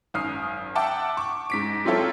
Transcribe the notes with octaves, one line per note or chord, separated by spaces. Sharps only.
G#1 F#2 D#6 F6 C7
E5 F#5 G5 A5 D6
C#6 D6
G#2 B6 D7
F#3 C4 E4 F4 A4 C#5